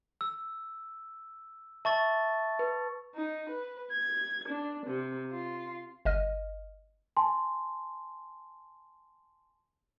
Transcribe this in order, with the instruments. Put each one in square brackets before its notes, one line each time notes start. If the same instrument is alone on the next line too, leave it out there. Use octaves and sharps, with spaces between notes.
[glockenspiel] E6
[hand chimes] E5 [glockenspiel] A5 C#6 A6
[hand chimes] B4
[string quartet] D#4
B4
G#6
D4
C3
F4
[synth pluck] G1 D#5 F6
[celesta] G#5 A5 C6